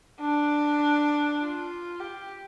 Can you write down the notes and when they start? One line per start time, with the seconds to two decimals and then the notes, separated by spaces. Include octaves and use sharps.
0.20 D4
1.40 F4
2.00 G4